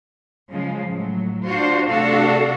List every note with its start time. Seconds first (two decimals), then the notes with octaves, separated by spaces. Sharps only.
0.51 C#3 F3 G#3
0.90 A2 F#3
1.47 D4 F4 F#4 C5
1.90 C3 A3 D4 F#4 A4 F5